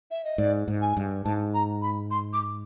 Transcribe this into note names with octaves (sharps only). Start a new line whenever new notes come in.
E5
D#5
G#2 D5
G#2
G#5
G2
G#2 A5
A#5
B5
C6
D6